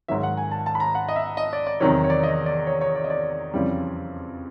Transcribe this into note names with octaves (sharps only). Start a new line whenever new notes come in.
G#2 D#3 F#3 E5
F#5
G#5
A5
A5
B5
A#5
F#5
D#5
E5
D#5
D5
D5
E2 C3 D#3 F#3 C#5
C#5
D5
D#5
D5
C#5
C#5
D5
D#5
D5
F2 C#3 E3 G3